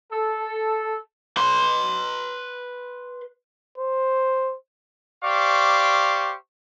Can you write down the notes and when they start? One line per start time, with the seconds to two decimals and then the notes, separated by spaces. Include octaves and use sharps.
0.12 A4
1.37 B4 C6
3.78 C5
5.23 G4 C5 D5 F5 C#6 D6